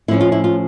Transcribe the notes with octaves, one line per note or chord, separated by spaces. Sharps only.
A2 F3 C#4 E4
F4
E4
F4